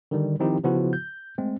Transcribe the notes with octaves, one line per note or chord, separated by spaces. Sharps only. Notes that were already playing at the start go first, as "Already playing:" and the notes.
D3 D#3 G3
D#3 F3 C4 D#4 E4 G4
C#3 F3 B3 E4 F#4
G6
G#3 A3 C4